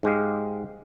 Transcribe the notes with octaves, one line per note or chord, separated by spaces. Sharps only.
G#2 G#3 G4 F5